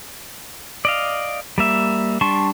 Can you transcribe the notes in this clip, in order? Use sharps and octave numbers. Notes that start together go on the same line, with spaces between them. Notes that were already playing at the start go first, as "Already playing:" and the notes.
D5 D#5 F5
G3 A#3 E5
G3 D4 A5 C6 C#6